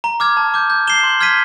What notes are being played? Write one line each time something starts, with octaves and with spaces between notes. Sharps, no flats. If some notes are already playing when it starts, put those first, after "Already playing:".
A#5
D6 F6 G#6
A5
D6 G6
G6
C7 E7 G7
C6
F6 G#6 B6 D#7